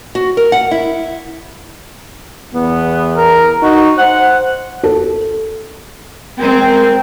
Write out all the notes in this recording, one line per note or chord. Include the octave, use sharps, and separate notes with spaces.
F#4
A#4
F#5
E4
E2 B3
A#4
D#4 F#4
C5 F#5
A4
G#3 C4 A#4 G5